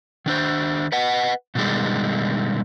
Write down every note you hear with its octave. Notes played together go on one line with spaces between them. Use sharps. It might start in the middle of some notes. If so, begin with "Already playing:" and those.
D#3 D4 C5
B4 D#5 F#5
B2 D3 D#3 G3 G#3